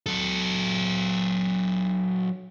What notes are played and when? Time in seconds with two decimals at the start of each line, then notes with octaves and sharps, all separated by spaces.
0.06 F#3 A4